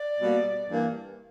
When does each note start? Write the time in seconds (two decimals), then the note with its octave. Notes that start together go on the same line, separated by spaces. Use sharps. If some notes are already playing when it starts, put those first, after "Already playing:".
Already playing: D5
0.20 B2 G3 A#3
0.69 G2 E3 A#3